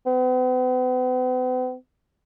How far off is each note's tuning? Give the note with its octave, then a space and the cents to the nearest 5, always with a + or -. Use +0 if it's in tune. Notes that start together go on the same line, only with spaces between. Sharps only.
B3 +45